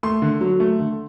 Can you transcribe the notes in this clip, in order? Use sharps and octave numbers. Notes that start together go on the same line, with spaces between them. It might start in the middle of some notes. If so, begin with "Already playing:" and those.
A3 C6
D3
F#3
A3
D3